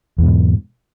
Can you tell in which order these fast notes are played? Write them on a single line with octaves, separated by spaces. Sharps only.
E2 B2 G#2